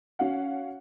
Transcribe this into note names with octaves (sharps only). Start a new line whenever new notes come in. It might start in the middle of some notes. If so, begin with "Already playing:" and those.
C#4 F#4 F5 F#5